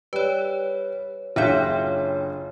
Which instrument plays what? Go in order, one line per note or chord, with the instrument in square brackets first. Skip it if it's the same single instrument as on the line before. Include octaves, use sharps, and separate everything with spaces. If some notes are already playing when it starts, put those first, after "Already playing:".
[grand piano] G3 [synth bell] B4 C#5
[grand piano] F#1 F4 G6 [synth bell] D4 C#5 [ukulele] G4 E5 F#5